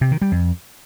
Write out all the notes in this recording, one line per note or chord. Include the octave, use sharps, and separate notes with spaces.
C3
D#3
G3
F2